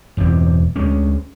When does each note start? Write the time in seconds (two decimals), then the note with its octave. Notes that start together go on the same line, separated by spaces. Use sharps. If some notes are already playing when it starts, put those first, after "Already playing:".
0.17 E1 E2 G2 C4
0.76 D2 G#3 C#4